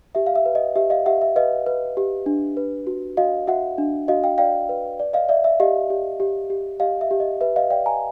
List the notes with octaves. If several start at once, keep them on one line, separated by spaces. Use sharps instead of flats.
G4 E5
F5
E5
B4
D#5
G4 E5
D#5 F5
G4 E5 F#5
E5
B4 D#5 F5
B4
G4
D4
B4
F#4
F#4 D#5 F5
F#4 E5 F#5
D4
F#4 D#5 F5
F5 G5
D5 F5 G5
B4
D5
D#5 F5
D5 E5
E5
G4 D#5 F5
G4
G4
G4
G4 D#5 F5
E5
G4
D#5
B4 E5
D#5 F5
D5 F5 G5
G#5 A#5